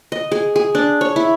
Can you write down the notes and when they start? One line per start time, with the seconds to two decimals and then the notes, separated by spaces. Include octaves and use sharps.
0.12 D#5
0.32 G#4
0.56 G#4
0.75 D4
1.01 C#5
1.16 E4